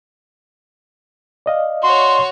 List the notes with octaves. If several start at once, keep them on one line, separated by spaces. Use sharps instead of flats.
D5 D#5 F5
F#4 C#5 C6